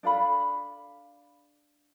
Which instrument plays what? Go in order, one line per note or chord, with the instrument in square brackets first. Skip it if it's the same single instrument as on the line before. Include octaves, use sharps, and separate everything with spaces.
[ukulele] D4 A4 F5 B5